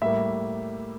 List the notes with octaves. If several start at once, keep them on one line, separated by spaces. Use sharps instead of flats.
A2 G3 A#3 E5